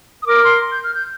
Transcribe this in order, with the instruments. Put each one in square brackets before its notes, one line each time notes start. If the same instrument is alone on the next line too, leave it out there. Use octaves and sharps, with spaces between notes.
[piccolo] D#6
[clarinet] A#4 [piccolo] D6
[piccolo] C6
G6
F6
G6